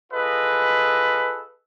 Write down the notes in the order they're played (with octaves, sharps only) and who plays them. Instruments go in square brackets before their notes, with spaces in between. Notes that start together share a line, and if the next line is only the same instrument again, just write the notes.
[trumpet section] F4 G#4 A4 B4 D#5